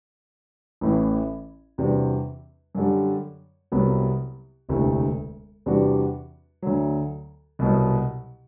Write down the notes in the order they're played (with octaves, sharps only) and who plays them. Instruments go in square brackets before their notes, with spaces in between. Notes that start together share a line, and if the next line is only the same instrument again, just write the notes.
[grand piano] A1 A2 E3
E2 C3 G3 D4 F#4
F#2 D3 G3
C2 C3 F#3 B3
E1 D2 C3 E3 A3
E2 C3 G3 D4 F#4
D2 D3 F#3
C2 B2 F#3